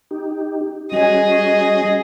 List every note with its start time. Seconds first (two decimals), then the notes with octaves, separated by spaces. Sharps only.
0.11 D#4 G4
0.92 G3 C#4 F#4 G#4 D#5